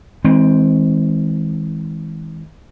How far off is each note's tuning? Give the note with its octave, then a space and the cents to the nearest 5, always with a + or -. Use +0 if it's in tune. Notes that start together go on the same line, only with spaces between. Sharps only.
E3 -45 G#3 +0 C4 +0